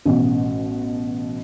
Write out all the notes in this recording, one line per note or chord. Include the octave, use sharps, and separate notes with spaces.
A1 B2